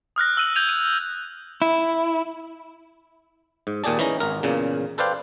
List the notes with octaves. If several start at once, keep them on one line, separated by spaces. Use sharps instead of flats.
D#6 F6 F#6 A#6
E6 F#6 D#7 F#7
G6 G#6 D#7 F7
D#7
E4
G#2
D#2 A#2 G4 G#4 D5 A5
E3 C#4 D#4 A#5
G#1 A#4
E2 A#2 C#3
A4 B4 C5 D5 F5 G5